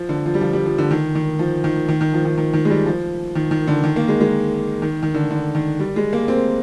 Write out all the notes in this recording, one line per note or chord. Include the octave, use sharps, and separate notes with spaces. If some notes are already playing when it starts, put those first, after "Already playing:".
Already playing: F3
D3
F3
G3
F3
G3
F3
D3
D#3
D#3
F3
D#3
D#3
D#3
F3
D#3
D#3
D#3
G#3
G3
F3
D#3
D#3
D3
D#3
A#3
G#3
G#3
D#3
D#3
D3
D3
D#3
G3
G#3
A#3
C4